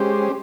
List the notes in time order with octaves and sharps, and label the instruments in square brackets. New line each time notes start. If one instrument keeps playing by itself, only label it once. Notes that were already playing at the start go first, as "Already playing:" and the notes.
Already playing: [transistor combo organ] G#3 C#4 G4 C5